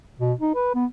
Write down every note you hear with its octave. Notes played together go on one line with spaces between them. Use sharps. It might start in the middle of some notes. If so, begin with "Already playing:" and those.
B2
D#4
B4
B3